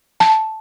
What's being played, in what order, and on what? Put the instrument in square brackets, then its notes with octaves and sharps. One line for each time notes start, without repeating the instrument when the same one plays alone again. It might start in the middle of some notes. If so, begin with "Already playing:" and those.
[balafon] A5